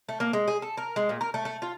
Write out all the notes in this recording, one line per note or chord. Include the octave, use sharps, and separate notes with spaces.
A3
A#3
G#3
G#4
A4
A#4
G#3
A#2
A#4
A3
A3
F4